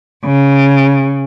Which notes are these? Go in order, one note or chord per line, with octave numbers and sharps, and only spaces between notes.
C#3